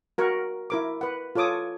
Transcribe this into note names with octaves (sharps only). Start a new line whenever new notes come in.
F#4 A#4 F#5 C#6
E4 A#4 D6
B4 F#5
F4 A4 C#5 D6 D#6